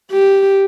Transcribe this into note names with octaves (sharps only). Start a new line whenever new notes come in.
G4